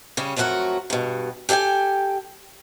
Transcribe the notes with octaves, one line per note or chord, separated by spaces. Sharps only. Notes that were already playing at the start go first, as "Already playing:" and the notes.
C#3 G3 C#4
F2 F#3 A3 B3 F#4 A#4
G2 B2
G4 A4 D#5 G5 G#5